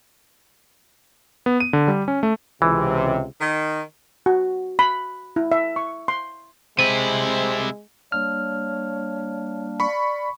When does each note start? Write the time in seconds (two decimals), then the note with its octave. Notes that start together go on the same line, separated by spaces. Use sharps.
1.46 B3
1.60 D#7
1.73 D3
1.88 G3
2.08 C#4
2.23 A3
2.62 C#2 C3 E3
3.40 D#3
4.26 F#4
4.79 B5
5.36 E4
5.52 E5
5.76 C#6
6.08 C6
6.79 C3 G#3 C4 E4 D#7
8.12 G3 A#3 D4 C#5 F6
9.80 D5 B5 C#6